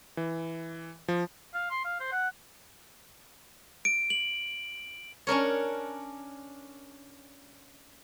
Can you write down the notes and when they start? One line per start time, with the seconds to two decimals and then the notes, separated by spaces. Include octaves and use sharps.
0.17 E3
1.08 F3
1.54 F5
1.71 C6
1.85 F5
2.00 C5
2.12 F#5
3.85 D7
4.10 F#7
5.27 C#4 D4 A#4 C#5